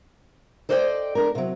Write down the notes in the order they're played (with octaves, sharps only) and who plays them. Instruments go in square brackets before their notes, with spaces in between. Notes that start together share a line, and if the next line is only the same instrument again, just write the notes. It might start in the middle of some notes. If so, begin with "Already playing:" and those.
[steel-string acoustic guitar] A4 C5 D5 D#5 F#5 G5
D4 A#4
C3 F#3